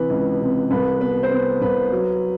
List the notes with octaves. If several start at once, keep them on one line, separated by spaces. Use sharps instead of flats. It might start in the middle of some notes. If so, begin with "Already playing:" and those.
Already playing: C3 E3 B4
C#2
C3
C2 B4
B3 B4
C5
B3 B4
C2 B4
F#3